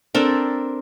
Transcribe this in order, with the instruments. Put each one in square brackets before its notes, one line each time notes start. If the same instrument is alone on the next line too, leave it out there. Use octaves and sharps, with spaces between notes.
[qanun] C4 D4 A4 A#4